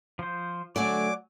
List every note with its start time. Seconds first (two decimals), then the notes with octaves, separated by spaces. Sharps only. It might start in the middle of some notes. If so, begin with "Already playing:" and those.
0.19 F3 C5
0.76 D3 F#3 A3 D5 F#5 G#5 D6